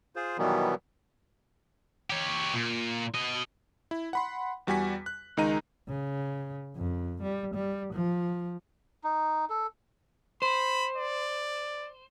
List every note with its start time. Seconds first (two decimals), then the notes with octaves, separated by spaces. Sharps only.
0.16 F4 G#4 C5
0.38 B2 D#3 E3 F#3 G3 B3
2.10 G4 C#5
2.54 A#2
3.15 B2 D#5
3.91 E4
4.13 F#5 B5 C6
4.67 E2 G3 F#4 G#5 B6
5.06 F#6
5.37 C#2 D#3 G#3 D#4 A#5 D#7
5.88 C#3
6.76 F2
7.23 G3
7.55 G3
7.93 F3
9.04 D#4
9.50 A4
10.42 C5 B5
10.97 D5